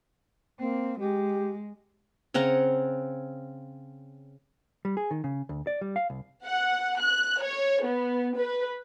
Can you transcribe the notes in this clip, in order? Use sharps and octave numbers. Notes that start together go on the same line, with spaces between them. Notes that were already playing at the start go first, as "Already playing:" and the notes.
A#3 C4
G#3 G4
C#3 C4 F#5 A#5
G3
G#4
D#3
C#3
D2
D5
G3
F5
C2
F#5
F#6
C#5
B3
B4